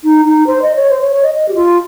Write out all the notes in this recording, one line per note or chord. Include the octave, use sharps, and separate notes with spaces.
D#4
D#4
C5
D#5
C#5
C5
C#5
C#5
D#5
D#5
G4
F4